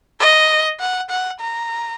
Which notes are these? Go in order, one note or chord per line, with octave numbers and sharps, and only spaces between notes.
D#5
F#5
F#5
A#5